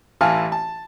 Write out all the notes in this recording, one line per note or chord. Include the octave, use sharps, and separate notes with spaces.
A1 E3 F5 A5 F6
A5